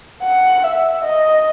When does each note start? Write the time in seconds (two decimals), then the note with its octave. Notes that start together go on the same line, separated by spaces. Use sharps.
0.23 F#5
0.63 E5
1.04 D#5